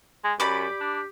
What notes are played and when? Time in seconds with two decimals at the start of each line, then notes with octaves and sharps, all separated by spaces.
0.24 G#3
0.40 F#2 G4 D5 B5
0.80 D4